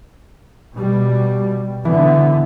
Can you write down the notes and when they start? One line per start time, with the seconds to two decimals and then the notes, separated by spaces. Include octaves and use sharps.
0.76 B2 G3
1.85 D3 E3 B3